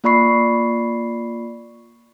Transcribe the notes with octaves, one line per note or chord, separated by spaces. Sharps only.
A#3 F4 D5 B5 C#6 C7